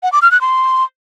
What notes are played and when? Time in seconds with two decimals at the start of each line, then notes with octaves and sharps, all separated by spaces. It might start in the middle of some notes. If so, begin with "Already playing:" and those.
0.03 F#5
0.13 D6
0.22 F6
0.32 F#6
0.41 C6